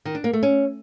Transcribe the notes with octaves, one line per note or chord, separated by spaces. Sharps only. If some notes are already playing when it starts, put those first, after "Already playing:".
D#3
D4
A#3
A3
C#4